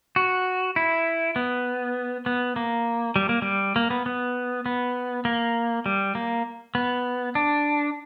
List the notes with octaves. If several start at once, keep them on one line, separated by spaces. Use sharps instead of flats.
F#4
E4
B3
B3
A#3
G3
A#3
G3
A#3
B3
B3
B3
A#3
G3
A#3
B3
D4